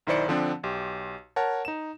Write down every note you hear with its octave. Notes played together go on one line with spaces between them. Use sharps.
B1 D#3 E4 C5 D5 C#7
D3 F3 C4 D4
B1 G4
A#4 C#5 F#5 A5
D#4 E7